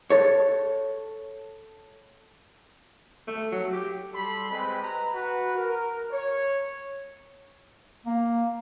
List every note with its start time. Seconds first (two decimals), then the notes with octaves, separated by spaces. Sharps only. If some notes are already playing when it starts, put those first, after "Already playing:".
0.10 A4 C#5
3.28 A3
3.52 F#3
3.73 G4
4.13 G3 A4 B5 C6
4.51 G#3 C4 G4 B4 B5
4.82 B4 A#5
5.14 F#4 B4
5.56 A#4
6.12 C#5
8.06 A#3